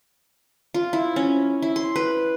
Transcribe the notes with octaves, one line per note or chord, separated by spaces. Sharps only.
F4
E4
C#4
E4
C6
B4